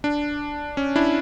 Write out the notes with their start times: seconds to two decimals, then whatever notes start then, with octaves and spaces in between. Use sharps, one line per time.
0.04 D4
0.77 C#4
0.96 D4 E4